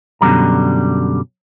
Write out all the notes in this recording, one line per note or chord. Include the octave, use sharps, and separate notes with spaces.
F#2 B2 D3 F3 G3 A#5